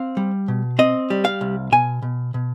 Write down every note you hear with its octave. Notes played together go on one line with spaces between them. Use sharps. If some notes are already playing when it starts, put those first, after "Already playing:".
Already playing: C4 F5
G3
B2
C4 D#5
G3
F5
C2
B2 G#5
B2
B2